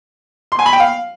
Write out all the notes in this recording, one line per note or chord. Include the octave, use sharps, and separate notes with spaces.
C6
G#5
B5
G5
F5